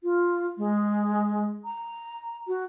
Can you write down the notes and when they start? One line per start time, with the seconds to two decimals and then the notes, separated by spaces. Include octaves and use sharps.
0.04 F4
0.58 G#3
1.65 A#5
2.48 F#4